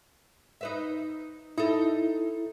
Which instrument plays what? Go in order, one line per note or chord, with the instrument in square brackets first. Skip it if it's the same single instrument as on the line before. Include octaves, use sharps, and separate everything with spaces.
[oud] D#4 B4 E5
[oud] D#4 A4 [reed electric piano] E4